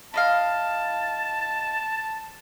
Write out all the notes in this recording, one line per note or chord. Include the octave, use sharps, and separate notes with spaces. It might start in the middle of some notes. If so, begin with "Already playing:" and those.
E4 D#5 F5 A5